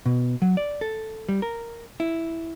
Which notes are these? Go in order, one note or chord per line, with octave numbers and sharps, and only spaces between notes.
B2
F#3
D5
A4
G3
A#4
E4